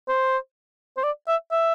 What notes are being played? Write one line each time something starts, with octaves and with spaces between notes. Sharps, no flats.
C5
C5
D5
E5
E5